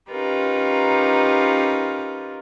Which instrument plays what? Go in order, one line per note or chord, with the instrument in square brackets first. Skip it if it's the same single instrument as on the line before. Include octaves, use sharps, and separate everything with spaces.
[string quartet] C#4 D#4 F4 G4 A#4 B4